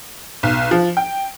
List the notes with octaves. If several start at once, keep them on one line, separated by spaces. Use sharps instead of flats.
B1
F3
G5